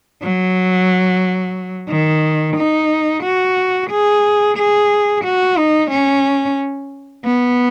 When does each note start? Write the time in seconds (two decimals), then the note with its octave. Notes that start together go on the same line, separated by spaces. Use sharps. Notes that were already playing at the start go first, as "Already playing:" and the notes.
0.22 F#3
1.89 D#3
2.57 D#4
3.23 F#4
3.90 G#4
4.58 G#4
5.25 F#4
5.58 D#4
5.91 C#4
7.26 B3